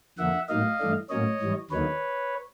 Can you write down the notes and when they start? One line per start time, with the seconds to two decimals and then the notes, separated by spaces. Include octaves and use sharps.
0.18 F2 D3 F3 A#3 E5 F#5
0.49 A2 F#3 A#3 D#4 D#5 F5
0.79 G2 E3 A3 D4
1.09 A2 F#3 A#3 C#4 C#5 D#5
1.40 G#2 E3 G3
1.71 D#2 D3 F#3 A#3 D#4 B4 C#5